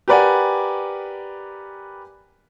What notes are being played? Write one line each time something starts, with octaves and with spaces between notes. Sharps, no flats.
G4 A#4 B4 D5 F#5 G#5